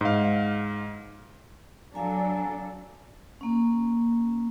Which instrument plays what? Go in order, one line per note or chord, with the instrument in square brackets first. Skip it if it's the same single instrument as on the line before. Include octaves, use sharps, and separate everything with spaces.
[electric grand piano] G#2 F5
[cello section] F#3 D4 A4 [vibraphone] F5 G#5 A#5
[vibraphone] A#3 C#4